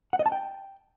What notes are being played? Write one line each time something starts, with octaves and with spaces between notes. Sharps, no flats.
F#5
D#5
A5
G5